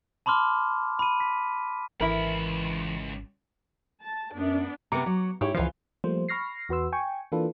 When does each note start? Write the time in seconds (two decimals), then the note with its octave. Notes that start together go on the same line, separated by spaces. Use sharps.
0.26 A5 B5 C6 D6 F6
0.99 B5 D#7
1.20 B6
2.00 G#1 C#2 E3 E4 A#4 B5
4.02 A5
4.34 F#2 B3 D4
4.92 C3 B3 A#5 D6 C#7
5.06 F#3
5.41 G#2 E4 G4 C#5
5.54 C#2 E3 F3 F4
6.04 F3 G3 A3 A#3 C5
6.29 B5 C#6 F6 A#6 C7
6.69 E2 F#4 B4 C6 E6
6.93 G5 G#5 C#6
7.32 E3 A#3 D4 F4 A4 B4